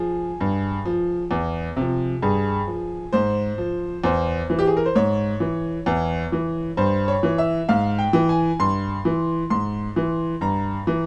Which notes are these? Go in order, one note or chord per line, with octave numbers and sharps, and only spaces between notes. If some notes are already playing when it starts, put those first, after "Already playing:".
Already playing: F3 G#4
G2
F3
E2
C3 F3
G2 G#4
F3
G#2 C5
F3
E2 C5
E3
G4
G#4
A#4
C5
G#2 C#5
E3
E2
E3
G2 C5
C#5
E3
E5
G#2 F5
G5
E3
G#5
G2 C6
E3
G#2 C6
E3
G2 A#5
E3